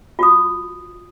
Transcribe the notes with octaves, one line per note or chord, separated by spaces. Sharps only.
F4 F#4 D#6